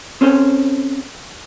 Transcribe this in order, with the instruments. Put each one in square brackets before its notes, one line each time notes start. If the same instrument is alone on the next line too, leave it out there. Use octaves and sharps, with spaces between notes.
[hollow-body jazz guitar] C4 C#4 A4 C5